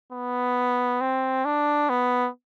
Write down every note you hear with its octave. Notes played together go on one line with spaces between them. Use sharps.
B3
C4
D4
B3